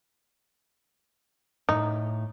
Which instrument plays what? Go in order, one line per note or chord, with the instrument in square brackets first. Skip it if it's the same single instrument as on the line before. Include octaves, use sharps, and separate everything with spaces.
[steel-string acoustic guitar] A2 [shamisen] D#4